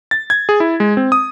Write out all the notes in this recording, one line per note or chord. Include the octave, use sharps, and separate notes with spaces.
A6
G#6
G#4
E4
G#3
C4
D#6